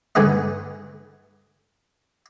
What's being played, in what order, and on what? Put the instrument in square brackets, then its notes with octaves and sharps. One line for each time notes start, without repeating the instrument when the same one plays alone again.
[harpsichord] G2 D3 G#3 G#4 B4 D#5